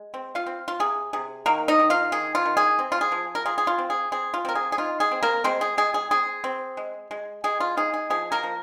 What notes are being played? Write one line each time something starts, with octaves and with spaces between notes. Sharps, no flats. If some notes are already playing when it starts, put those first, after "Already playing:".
Already playing: G#3
C4
F4 F5
C4
F4
C3 G#4
C3 G#4
D#3 A#3 A#4
D#4 D#5
D#3
F4 F5
D#3 G#4
F4
D#3
G#4
C4
F4
G#4
F3
A#4
F4 G#4
G#4
F4
C4
G#4
C4 G#4
F4
C4 A#4
G#4
G#4
D#4 F4
G#4
C4
A#3 A#4
G#3 C4 C5
G#4
G#3 G#4
G#4
C4 G#4
C4
G#3
G#3
G#3 G#4
F4
D#4 G#4
G#4
F3 G#4
A#3 A#4
F3